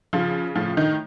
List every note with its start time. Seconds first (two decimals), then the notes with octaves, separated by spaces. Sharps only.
0.13 C#3 F3 F4
0.55 A2 F3 F4
0.77 D#3 D#4